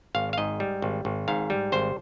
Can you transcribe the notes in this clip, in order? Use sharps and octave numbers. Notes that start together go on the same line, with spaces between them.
G#1 F5
F5
G#2 D#5
G3
G#1
G#1
G#2 F5
G3
G#1 C5